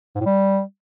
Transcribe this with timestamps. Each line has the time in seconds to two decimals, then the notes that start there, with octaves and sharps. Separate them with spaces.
0.15 G#2
0.21 A2
0.26 G3